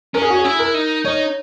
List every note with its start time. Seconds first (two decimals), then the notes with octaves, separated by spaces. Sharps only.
0.14 C#4 A#4
0.22 G#4
0.30 F#4
0.39 G#4
0.45 E4
0.59 A#4
0.74 D#4
1.05 D#4 C#5